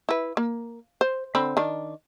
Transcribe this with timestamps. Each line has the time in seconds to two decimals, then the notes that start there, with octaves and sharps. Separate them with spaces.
0.09 E4 B4
0.37 A#3
1.01 C5
1.35 D3 C4 B5
1.57 D#3 D4